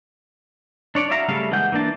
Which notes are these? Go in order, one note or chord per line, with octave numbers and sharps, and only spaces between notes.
D4 C#5 D5
E4 F#4 E5 F5 A#5
C#3 G3 A3 A4 F5
E3 G#3 A#3 F#5 G6
E3 A#3 D4 A5